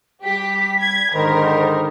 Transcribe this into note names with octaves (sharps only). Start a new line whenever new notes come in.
G3 G4 B6
G#6
G#2 D3 D#3 A#4 C5 B5